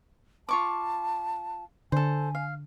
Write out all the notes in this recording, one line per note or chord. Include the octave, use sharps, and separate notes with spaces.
F4 A5 C#6 D6
D3 A4 C5 G#5
F5